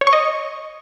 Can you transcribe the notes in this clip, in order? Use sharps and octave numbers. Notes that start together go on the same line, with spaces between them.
C#5
C#6
D#5